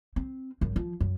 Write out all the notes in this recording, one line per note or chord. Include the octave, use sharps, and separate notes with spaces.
C4
G#1 F#2
F3
F#2